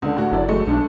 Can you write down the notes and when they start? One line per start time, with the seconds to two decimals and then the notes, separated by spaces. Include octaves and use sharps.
0.02 C#2 D3
0.17 A2 F#4
0.32 F#1 F#3 E4 D5
0.48 G#3 A3 F#4
0.66 B1 D4